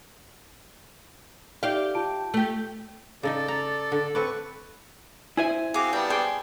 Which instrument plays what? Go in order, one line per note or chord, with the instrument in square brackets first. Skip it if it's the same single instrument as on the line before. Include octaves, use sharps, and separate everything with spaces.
[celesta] D#4 D5 E5 [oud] G4 F5
[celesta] F4 A5 D7
[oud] A3 G4
[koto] C#3 D#4 D#5 [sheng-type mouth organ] A4 D5
[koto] A#5
D3
[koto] C4 A4 D5 [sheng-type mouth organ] B4 C#6
[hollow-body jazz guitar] E4 C5 E5 [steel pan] G#5
[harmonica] C4 F#4 F5 [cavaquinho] G#4 D6
[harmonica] G3 B3 D4 [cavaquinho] G5
[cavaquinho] G#4 C6 [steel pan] G5